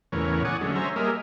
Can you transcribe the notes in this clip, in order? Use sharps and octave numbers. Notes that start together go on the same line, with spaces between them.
E2 A2 C#3 E3 A#4 C#5
D5 F#5 G#5 C#6 D#6
D3 F#3 G#3 A3 C#4
C5 C#5 E5 G#5 A#5
G3 A#3 G#4 A#4 D#5 E5